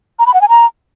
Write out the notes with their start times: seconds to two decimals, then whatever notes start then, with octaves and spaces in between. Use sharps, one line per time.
0.19 A#5
0.27 B5
0.34 F#5
0.41 G#5
0.49 A#5